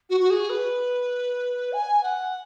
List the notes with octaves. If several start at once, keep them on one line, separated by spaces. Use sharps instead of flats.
F#4
F#4
G#4
B4
G#5
F#5